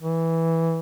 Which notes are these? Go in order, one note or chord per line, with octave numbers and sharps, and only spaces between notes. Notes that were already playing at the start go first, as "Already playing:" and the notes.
E3